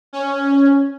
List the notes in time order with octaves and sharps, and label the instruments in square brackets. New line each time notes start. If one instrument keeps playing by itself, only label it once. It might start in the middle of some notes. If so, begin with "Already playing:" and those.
[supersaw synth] C#4